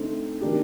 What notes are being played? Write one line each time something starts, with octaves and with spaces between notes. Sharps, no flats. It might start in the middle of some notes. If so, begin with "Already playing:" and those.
Already playing: D3 A3 C4 D#4
D#3 A#3 D4 G4